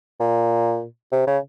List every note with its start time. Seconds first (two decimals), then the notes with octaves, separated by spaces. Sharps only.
0.20 A#2
1.12 C3
1.27 C#3